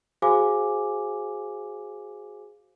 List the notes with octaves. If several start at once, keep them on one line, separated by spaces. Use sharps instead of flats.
F#4 G#4 C5 F5 G#5 D6